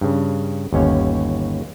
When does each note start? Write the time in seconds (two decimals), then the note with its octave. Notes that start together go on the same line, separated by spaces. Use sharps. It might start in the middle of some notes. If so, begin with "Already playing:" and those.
0.01 G2 C#3
0.73 G1 D#2 C#4 C#5